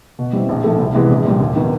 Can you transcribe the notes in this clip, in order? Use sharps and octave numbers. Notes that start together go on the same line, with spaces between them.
B2
G3 C4 E4
A#1
G#2 F3 A3
C2
C3 E3 G#3 B3
A#1
A#2 G3
D#2
D#3 F#3 B3